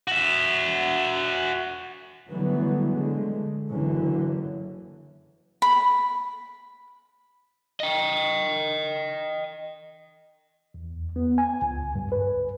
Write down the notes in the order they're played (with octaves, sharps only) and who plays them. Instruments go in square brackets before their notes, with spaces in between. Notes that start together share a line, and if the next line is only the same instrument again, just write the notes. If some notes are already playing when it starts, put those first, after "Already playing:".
[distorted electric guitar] F#4 E5
[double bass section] D3 E3 F#3 G3 A3 B3
D3 G#3 A3
F#1 D3 E3 F#3 C#4
[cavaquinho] B5
[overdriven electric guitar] D#5 G5
[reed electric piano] E2
B3
G#5
C#2
G2
B4